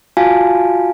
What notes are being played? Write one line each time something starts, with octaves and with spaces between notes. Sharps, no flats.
F4 F#4 F5 G#5 A5